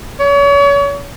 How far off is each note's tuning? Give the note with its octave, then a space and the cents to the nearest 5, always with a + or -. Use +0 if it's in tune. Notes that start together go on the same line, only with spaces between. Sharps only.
C#5 +35